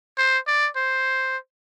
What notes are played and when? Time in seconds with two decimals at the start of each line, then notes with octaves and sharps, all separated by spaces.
0.18 C5
0.47 D5
0.76 C5